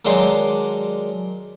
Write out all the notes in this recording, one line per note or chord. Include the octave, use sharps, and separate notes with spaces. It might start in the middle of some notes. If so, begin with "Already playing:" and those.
D#3 F#3 G#3 D4 C6 D6